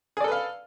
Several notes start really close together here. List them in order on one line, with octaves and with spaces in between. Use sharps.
G#4 D5 A4 B4 F5